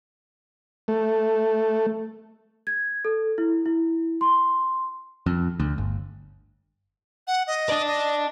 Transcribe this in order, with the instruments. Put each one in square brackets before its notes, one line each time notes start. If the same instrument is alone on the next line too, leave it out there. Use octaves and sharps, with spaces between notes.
[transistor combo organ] A3
[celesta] G#6
A4
E4
E4
C6
[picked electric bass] F2
D2
G1
[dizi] F#5
D#5
[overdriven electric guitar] D5 A5
[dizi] D#5